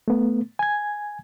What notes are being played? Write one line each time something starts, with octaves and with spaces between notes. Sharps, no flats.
A3 B3
G#5 G#6